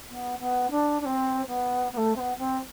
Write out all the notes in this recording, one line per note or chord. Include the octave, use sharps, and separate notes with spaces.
B3
B3
D4
D4
C4
B3
B3
A3
C4
B3
C4